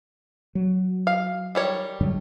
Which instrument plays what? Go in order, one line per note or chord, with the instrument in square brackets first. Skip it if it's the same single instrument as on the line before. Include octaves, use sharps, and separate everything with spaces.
[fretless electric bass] F#3
[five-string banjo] F5
D#3 G3 C#5
[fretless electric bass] G2 D3 F#3